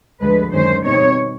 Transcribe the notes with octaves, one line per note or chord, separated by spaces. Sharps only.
D2 D3 F3 G#3 B4
F#2 D#3 G#3 C#4 C5
B2 G3 C4 D#4 C#5